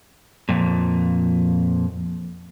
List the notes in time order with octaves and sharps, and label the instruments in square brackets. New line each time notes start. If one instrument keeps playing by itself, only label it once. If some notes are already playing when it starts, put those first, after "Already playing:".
[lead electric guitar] F2 A#2